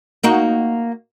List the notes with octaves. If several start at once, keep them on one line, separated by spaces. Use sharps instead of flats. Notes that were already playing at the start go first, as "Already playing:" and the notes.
A#3 D#4 F#4